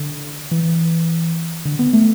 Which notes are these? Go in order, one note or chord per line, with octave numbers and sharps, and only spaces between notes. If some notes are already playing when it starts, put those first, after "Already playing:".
Already playing: D3
E3
D3
B3
A3